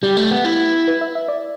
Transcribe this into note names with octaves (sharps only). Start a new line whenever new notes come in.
G3 G4
A3
B3
E4
B4
E5
E5
D5